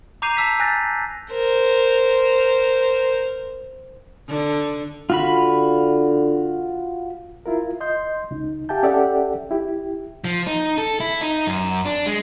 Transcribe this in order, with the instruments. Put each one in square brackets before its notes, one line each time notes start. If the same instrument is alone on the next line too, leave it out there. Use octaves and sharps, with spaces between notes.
[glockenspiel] A#5 D6 G6 C7 D#7 F7
A5 E6 B6
G#5 F#6 G6 A6 A#6
[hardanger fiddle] A#4 C5
[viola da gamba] D3
[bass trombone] D3 [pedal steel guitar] F4 F#4 B5
[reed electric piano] E4 F4 A#4
D#5 C6 G6
C#2 D#4
G4 E5 F5 G#5 A5 G6
C#4 G4 A4 D5 E5 F#5
E4 G4
[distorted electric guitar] F3
D#4
A4
E4
D#4
F#2
D4
G#3